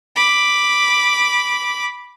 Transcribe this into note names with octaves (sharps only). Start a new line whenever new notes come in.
B5 D6